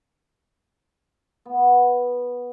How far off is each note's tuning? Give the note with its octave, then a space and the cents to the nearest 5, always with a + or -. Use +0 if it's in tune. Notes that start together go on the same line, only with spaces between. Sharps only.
B3 -10